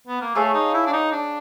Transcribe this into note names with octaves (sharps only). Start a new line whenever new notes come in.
B3
A#3
A3 G#4 C#5 F5 A5
D#4
E4
D4
D#4
D4